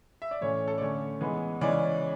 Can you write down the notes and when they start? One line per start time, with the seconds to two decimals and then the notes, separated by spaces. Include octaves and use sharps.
0.22 E5
0.31 D5
0.41 A2 E3 A3 C#4 C#5
0.68 A4
0.78 D5
0.81 D3 A3 C#4 C#5
1.21 E3 G#3 B3
1.61 C#3 E3 G#3 C#4 D5